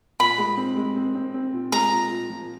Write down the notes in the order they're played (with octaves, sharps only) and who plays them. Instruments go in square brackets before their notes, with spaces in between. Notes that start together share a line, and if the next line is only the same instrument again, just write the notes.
[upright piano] A#2 [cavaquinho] B5
[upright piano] G#3
C4
G#3
C4
C4
C4
A#2
[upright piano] G#3 [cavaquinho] A#5
[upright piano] A#2
A#2
F3